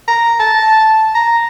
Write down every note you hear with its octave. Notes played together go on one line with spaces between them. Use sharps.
A#5
A5
A#5